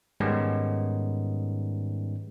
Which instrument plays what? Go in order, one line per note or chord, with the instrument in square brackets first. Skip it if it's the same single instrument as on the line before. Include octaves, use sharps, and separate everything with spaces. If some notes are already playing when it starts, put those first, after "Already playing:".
[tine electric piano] G#2 D#3 G3 G#3 B3 C#4